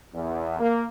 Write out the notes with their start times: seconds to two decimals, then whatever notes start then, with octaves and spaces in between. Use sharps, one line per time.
0.12 E2
0.59 A#3